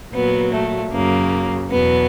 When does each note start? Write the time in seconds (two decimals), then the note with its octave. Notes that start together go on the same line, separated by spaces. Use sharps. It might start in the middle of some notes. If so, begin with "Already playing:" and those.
0.14 A#2 F#3 B3
0.53 A3
0.92 F#2 C#3 F#3 A#3
1.71 E2 B2 F#3 B3